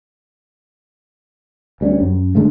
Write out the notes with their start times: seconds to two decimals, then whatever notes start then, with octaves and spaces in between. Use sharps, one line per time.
1.81 D2 G3 G#3 C#4
2.01 F#2
2.35 G#2 D3 G#3 A3